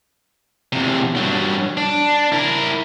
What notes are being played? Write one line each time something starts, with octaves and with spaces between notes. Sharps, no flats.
E2 C3
G2 F#3
D4
E4 A#4